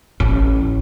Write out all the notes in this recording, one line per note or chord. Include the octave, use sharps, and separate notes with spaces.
A1